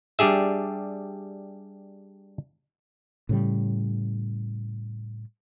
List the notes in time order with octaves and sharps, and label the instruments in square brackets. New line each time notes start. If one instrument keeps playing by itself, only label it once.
[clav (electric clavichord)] G3 D4 G4 G#4 E5
[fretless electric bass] A2 C#3 G3